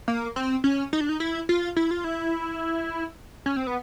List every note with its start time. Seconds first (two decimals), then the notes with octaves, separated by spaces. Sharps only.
0.08 A#3
0.36 C4
0.64 C#4
0.93 D#4
1.01 D4
1.09 D#4
1.20 E4
1.49 F4
1.76 E4
1.91 F4
2.04 E4
3.46 C#4
3.56 C4
3.67 B3